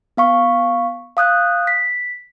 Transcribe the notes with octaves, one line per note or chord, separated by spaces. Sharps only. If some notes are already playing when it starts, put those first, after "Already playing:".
B3 F5 C#6
F5 D#6 F#6 G6
B6